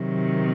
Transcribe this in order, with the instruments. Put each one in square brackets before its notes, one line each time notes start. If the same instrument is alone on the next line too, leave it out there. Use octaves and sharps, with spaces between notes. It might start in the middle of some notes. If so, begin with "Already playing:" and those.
Already playing: [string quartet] C3 D#3 F#3